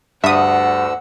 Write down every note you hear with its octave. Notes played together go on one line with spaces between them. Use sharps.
D2 G2 D3 E5 F#5 D#6 E6